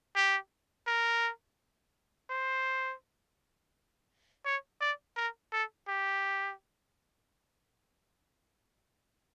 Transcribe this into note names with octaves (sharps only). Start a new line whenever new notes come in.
G4
A#4
C5
C#5
D5
A#4
A4
G4